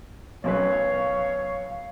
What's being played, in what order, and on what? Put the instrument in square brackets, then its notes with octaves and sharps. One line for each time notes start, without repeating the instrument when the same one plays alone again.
[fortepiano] B1 F#2 B4 [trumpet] C#5 [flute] F5